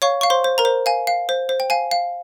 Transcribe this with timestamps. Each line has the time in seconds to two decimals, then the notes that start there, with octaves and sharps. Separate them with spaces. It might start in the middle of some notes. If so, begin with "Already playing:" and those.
0.02 C#5 F5 C#6
0.21 F5 C#6
0.30 C5 C6
0.44 C5
0.58 A#4 A#5
0.65 C5
0.86 F5 G#5
1.07 F5
1.29 C5
1.49 C5
1.60 G5
1.70 F5 G#5
1.91 F5